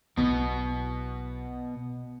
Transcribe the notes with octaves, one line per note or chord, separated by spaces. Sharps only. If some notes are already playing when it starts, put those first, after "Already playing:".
B1 B2 B3 E4